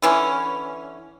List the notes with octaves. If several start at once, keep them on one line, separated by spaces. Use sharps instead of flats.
D3 E3 C#4